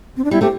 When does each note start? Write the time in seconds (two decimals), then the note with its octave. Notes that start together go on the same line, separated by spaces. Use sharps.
0.17 C4
0.25 D4
0.31 G3 B3 E4
0.41 A3 C4 G4